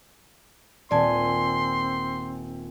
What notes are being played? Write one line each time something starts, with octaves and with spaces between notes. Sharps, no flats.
D#1 C4 D5 G#5 A5 C6